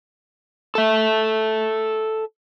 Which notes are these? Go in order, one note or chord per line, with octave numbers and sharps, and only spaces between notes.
A4 E5